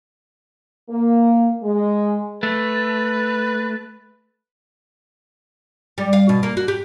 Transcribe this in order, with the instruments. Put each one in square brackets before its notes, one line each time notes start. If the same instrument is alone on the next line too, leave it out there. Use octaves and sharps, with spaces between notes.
[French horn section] A#3
G#3
[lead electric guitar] A3 [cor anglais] B4
[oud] G3
F5
B2
A#3
F#4
G4